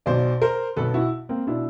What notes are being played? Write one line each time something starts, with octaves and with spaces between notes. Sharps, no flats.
B1 B2 C5 D5
A#4 C5
B1 B2 A4 B4
E4 F#4
A#3 C4
B2 D4 E4